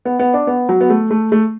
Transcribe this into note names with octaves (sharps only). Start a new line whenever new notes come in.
B3
B3
D4
B3
F#3
B3
A3
A3
A3